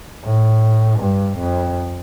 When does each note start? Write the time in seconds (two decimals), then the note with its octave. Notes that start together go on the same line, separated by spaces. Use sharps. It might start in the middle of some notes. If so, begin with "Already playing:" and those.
0.25 A2
1.00 G2
1.38 F2